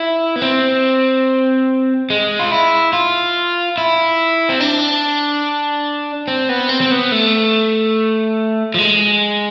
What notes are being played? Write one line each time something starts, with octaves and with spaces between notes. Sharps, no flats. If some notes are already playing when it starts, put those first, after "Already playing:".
Already playing: E4
B3
C4
G#3
F4
E4
F4
E4
C4
D4
C4
B3
C4
C4
B3
A3
F3
G#3